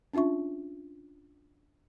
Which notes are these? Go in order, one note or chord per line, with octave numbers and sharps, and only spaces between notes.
C#4 D4 F4 E5 C#6